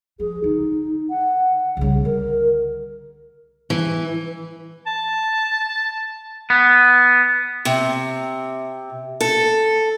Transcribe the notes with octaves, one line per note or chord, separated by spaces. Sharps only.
F3 G#4
D3 D#4
F#5
C2 C#3 G3
D3 A#4
E3
A5
B3
C3
A4